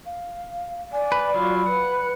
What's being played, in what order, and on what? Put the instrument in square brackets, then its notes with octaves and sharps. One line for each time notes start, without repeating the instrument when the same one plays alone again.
[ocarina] F5
[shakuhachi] D5 [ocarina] G#5
[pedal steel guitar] B4
[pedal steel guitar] F#3 F4 [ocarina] B5
[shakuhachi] B4 [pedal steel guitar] F#5